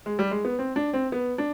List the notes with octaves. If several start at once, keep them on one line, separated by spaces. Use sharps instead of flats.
G#3
G3
G#3
B3
C4
D4
C4
B3
D4